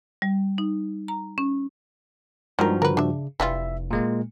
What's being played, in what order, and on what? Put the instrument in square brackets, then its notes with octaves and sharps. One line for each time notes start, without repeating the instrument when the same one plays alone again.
[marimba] G3
D#4
A#5
C#4
[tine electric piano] G2 F3 F#4 [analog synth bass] G#3 [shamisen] D#4 A#4
[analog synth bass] D3 [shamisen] A#4 B4
[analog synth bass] C#3 [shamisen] D4 E5
[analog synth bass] F1 [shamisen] E3 G3 F4 [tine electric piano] E5
[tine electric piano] A#2 G#3 A#3